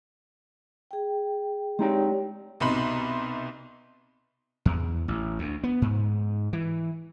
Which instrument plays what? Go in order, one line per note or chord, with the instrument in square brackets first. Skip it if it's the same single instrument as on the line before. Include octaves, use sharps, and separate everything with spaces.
[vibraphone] G#4 G5
[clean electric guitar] G#3 D#4 G5 [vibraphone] G4 C#5 D5
[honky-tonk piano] C2 B2 D#4 B5 C6
[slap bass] E2
A1
D2
B3
G#2
E3